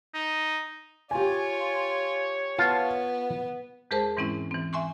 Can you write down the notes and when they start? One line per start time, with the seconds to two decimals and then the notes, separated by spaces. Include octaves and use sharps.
0.14 D#4
1.11 F4 G4 C#5 G#5
2.59 B3 F4 A5
3.91 E2 G#3 G#4 A#4 C5 A5
4.17 G#2 E3 G#3 C4 C#4 E4
4.51 E3 C4
4.73 E5 G#5 C6 C#6